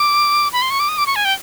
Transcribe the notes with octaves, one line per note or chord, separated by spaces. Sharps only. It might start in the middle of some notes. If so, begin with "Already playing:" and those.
Already playing: D6
B5
C6
C#6
D6
D#6
D6
C#6
G#5
G5